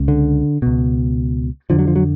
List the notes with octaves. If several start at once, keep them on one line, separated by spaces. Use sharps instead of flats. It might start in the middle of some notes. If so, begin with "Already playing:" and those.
Already playing: C#2 C#3
D3
C#2 B2
F2 D3 F3
F#3
F3
F#3